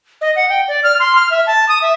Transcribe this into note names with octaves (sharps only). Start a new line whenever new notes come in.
D#5
F#5
G5
D5
F6
C6
F6
E5
A5
D#6
E5